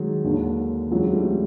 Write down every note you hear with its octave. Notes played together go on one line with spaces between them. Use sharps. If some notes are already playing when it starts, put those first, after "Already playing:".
Already playing: D#3 F#3 G#3
D#2 D3
F2 C#3 E3 F#3 G#3
G3 A3